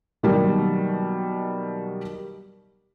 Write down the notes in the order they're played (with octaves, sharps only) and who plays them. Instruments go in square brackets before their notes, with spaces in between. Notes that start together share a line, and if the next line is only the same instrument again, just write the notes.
[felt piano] B2 D#3 F#3 G3 A#3